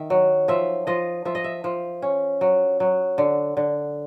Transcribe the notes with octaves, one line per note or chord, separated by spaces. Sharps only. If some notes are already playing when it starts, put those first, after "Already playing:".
Already playing: D#3 E5
F#3
F3 E5
F3 D#5
F3 E5
D#5
E5
F3
C#4
F#3
F#3
D3
D3